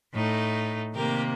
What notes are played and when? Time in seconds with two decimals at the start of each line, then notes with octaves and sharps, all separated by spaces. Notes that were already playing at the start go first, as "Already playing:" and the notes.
0.13 A2 A3 D#4
0.94 C3 D#3 A#3 G4 A#4